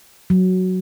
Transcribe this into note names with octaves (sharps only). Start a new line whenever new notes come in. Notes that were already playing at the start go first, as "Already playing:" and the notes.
F#3